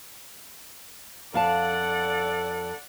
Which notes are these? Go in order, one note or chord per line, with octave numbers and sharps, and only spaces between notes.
F2 A4 D5 F5 F#5 A5